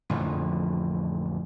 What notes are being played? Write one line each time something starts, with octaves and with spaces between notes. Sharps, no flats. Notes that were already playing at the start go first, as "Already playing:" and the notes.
A1 F2 D3 F3